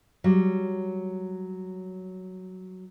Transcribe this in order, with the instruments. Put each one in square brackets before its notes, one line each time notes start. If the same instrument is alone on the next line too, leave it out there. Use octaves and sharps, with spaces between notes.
[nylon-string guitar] F#3 G3